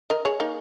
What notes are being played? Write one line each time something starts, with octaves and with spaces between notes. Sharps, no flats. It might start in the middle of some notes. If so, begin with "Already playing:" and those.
A#4 D#5
G#4 C#5
A#3 D#4